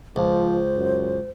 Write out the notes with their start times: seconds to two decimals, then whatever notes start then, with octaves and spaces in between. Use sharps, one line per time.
0.16 C#2 F3 C5
0.76 F#2